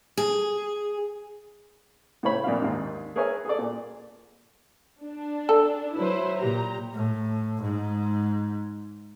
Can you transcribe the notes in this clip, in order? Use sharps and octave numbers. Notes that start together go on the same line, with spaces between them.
G#4
A2 C#3 C5 C#5 B5
F2 A#2 D4 F5
D#2 G#2
G#4 A#4 B4 C#5 E5 G#5
G#4 A4 D5
A#2
D4
A4
F#3 E4 B4 C5
A#2 G4 A#5
A2
G#2